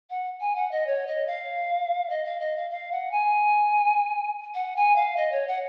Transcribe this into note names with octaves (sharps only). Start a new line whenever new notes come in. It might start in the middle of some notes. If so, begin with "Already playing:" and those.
F#5
G#5
F#5
D#5
C#5
D#5
F5
D#5
F5
D#5
F5
F5
F#5
G#5
F#5
G#5
F5
D#5
C#5
F#5